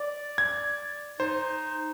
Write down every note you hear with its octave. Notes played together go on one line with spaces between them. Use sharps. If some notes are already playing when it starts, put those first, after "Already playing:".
D5
G#6
D#4 C5